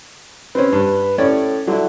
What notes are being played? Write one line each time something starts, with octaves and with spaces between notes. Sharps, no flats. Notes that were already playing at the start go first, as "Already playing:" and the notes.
C4 C#4 B4
G2
A2 C#4 C#5 D5
D3 F#3 E4